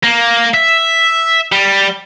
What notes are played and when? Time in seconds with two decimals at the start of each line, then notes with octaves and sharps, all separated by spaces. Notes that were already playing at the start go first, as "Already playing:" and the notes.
0.04 A#3
0.54 E5
1.52 G3